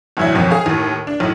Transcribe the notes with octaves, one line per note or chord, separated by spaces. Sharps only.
E2 A2 D3 F#3 D4 E4
G#1 F2 B2 C#5
G#4 F5
D#2 A2
D4
B1 A2